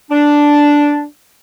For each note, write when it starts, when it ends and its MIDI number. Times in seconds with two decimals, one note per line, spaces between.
0.11 1.04 62